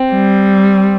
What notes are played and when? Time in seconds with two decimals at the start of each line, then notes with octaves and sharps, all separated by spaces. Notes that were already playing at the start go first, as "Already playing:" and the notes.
Already playing: C4
0.12 G3